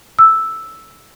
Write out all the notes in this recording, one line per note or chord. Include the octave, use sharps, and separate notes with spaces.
E6